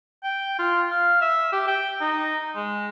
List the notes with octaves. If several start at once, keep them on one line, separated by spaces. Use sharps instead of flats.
G5
F4
F5
E5
G4
G5
D#4
G#3